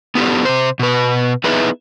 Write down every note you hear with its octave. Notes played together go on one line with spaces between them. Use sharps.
B3 E4 F#4 G4 A4
C3 C5
B2 B4
B3 D#4 E4 G#4 B4